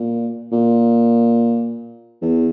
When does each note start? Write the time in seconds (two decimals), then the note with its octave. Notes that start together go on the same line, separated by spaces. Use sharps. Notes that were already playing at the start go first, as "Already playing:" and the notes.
Already playing: A#2
0.52 A#2
2.22 E2